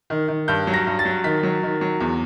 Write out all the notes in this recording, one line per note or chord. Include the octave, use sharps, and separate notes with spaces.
D#3
D#3
G2 G6
F#3
A#6
G2
A6
F#3
D#3 B6
F#3
D#3
F#3
E2